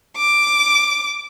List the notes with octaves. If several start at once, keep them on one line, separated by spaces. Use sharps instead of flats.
D6